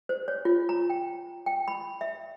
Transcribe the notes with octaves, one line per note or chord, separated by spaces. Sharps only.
C5
C#5
F4
A#5
G5
G5
B5
E5